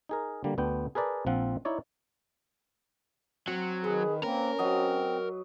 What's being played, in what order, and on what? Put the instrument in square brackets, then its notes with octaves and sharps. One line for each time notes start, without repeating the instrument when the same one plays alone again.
[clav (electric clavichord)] D#4 G#4 A#4
D3 G3 A#3
D2 B3 D4 G5
G#4 A#4 B4 D5 A5
A#1 F3 C4 F4 F#5
D#4 E4 C#5 D5
[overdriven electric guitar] F#3 [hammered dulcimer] C4
[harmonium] D#3 [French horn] G#4 [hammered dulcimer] B4
[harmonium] A#3 C4 [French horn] C#4 [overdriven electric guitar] A#4
[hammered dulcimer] F#3 D#5 [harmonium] C4